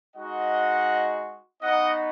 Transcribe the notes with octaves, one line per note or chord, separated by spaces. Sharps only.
G#3 D#4 F#4 D#5 F#5
B3 D#4 F#4 D#5 F#5